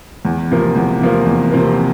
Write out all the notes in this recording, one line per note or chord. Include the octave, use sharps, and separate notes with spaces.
E2
C3 F3 A#3
E2
C3 F3 A#3
E2
C3 F3 A#3